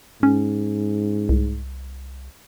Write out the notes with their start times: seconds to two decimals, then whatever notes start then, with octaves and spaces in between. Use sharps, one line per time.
0.23 G#2 C#4
1.29 C2